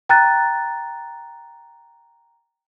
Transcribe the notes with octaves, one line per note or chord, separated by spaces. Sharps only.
G5 A#5 F#6 A6